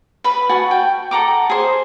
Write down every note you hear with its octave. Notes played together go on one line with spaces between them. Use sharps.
B4 B5
F#4 F#5 G#5 A5
G5
A4 F#5 A#5 D6
G#4 C5